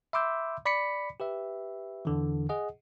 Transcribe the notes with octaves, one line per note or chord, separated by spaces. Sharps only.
E5 B5 C6 D6 E6 G6
D5 B5 D6 B6 C#7
G4 B4 E5
E2 D3 E3
G#4 D#5 F#5